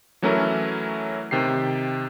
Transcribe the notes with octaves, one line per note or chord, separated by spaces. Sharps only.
E3 F#3 A3 C#4 E4 A#4
C3 D#3 G4 C7